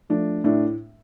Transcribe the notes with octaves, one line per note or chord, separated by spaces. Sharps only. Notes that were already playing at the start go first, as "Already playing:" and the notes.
F3 A3 D4
A2 A3 D4